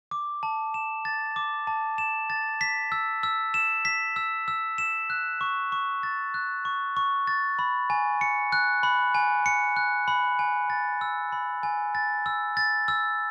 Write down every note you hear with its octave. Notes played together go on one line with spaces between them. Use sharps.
D6
A5
E7
A6
D6
A5
E7
A6
B6
E6
E6
E7
B6
E6
E6
E7
F#6
C#6
C#6
A6
F#6
C#6
C#6
A6
B5
G#5
C#7
F#6
B5
G#5
C#7
F#6
B5
G#5
A6
E6
B5
G#5
A6
E6
A6
E6